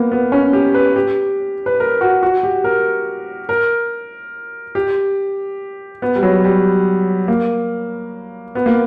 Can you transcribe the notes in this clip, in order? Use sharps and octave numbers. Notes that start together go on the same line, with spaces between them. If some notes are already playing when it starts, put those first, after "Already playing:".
Already playing: A#3 B3
B3
C#4
G4
B4
G4
B4
A#4
F#4
F#4
G4
A#4
A#4
G4
B3
G3
F#3
G3
A#3
B3
A#3